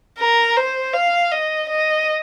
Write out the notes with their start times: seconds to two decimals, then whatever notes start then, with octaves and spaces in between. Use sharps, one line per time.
0.18 A#4
0.56 C5
0.94 F5
1.31 D#5
1.69 D#5